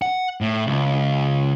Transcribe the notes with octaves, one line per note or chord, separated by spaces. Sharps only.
F#5
A2
C#2